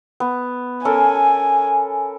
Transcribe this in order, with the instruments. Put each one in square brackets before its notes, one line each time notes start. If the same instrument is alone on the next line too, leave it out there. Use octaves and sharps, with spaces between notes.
[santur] B3
[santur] C#4 A4 A#4 [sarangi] G#5